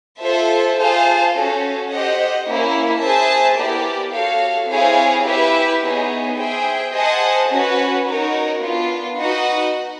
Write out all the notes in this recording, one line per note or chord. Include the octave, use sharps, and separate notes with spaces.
F4 A4 C5 E5 A5
F4 G#4 C5 F5 A5
C#4 F#4 A4
G4 C5 D#5 F#5
A#3 C#4 E4
G#4 C5 E5 A5
B3 E4 G4 A#4 D5
F#4 A4 C#5 F5
C4 E4 G#4 C#5 F5
E4 G4 B4 E5
B3 D#4 G#4 C#5
G#4 C5 E5 G5
G#4 C5 D#5 F#5 A5
C#4 F#4 B4
D#4 F#4 A#4 C#5
B3 D4 F4
D#4 F#4 B4 D#5 F#5